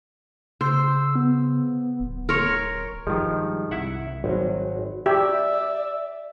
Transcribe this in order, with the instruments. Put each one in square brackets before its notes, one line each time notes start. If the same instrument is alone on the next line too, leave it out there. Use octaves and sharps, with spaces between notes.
[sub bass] C#3 [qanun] C5 [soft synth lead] E6
[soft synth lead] B3
[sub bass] D1
[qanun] A#4 C#5 [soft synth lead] C6
[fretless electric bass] G2 G3 G#3 [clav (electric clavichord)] D#3 F3
[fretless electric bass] C2 [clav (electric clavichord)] E4 E5 F#5
[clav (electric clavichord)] G#1 [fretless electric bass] F#3
[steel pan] G4 [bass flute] D5 [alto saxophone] E5